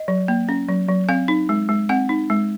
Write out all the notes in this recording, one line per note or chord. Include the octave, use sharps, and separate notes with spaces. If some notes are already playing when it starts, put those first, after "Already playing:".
Already playing: D#5
F#3
A#3
C#4
F#3
F#3
C4 F5
D#4
G#3
G#3
C4 F#5
D#4
G#3